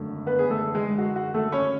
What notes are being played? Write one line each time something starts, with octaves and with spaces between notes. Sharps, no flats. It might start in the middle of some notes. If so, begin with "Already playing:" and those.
Already playing: G#1 F#2 D3 A3
B3 B4
G#4
A3 A4
G#3 G#4
F#4
F#4
A3 A4
C#4 C#5